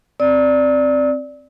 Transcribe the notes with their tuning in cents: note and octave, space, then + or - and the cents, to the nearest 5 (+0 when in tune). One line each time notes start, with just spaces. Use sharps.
C4 +0 D5 +0 E6 -40